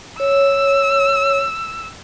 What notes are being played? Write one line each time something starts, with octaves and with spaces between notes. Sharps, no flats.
C#5 E6